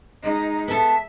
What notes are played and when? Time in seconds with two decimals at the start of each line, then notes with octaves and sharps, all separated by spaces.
0.22 G#3 D#4
0.68 B3 A4 E5